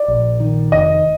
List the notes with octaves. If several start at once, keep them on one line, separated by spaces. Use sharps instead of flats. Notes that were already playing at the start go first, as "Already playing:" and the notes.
Already playing: D5
A#1
D#3
F1 D#5